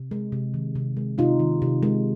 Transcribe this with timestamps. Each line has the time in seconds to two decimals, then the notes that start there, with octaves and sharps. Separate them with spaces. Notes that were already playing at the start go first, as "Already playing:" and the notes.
Already playing: C3
0.11 G#3
0.32 C3
0.54 D#3
0.76 C3
0.97 G#3
1.18 C3 D#4 F4
1.39 D#3
1.62 C3
1.83 G#3